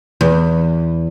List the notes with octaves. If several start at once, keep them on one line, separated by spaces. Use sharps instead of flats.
E2